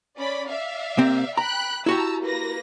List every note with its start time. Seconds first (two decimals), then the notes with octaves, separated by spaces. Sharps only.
0.18 C#4 D5 B5
0.49 D5 E5 F5
0.97 C3 A#3 C4
1.37 G5 A#5 B5 F#6
1.86 E4 F#4 G4 A5 A#5 E6
2.23 A#3 B4 A#6